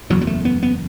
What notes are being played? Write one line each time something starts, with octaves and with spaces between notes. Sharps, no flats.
F#1 E2 B2 F#3
F#3
A3
B3
B3